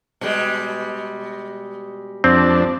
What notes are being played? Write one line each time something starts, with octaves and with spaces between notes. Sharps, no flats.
B2 G3 G#3
F2 C4 D4